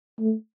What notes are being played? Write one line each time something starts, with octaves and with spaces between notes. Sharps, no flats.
A3